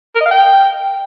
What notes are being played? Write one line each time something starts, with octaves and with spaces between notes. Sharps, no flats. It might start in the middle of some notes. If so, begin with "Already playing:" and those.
A#4
D#5
F5
G5